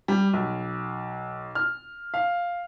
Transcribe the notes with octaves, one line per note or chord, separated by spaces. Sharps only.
G3
B1
F6
F5